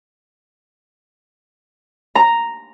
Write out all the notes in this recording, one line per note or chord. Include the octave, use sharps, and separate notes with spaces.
A#5